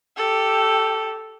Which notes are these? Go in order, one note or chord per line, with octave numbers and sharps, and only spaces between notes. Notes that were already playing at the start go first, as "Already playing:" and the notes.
G4 A4